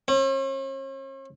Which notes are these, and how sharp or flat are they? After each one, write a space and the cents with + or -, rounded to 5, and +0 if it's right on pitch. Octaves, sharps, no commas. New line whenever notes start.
C#4 -45